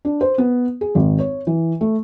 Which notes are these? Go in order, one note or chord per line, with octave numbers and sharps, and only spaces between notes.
D4
C5
B3
G#4
G#1
C#5
E3
A3